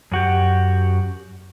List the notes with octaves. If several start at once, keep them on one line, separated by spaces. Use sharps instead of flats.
F#2 F#4 G4